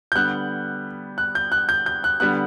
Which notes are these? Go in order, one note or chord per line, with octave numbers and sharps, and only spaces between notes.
G6
D3 G3 B3 F#6
F#6
G6
F#6
G6
G6
F#6
D3 G3 B3 F#6